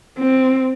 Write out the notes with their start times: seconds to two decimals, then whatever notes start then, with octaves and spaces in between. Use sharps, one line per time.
0.19 C4